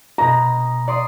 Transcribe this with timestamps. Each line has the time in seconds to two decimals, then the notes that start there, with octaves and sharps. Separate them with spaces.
0.18 B2 A#5 A#6
0.88 D5 C6 D#6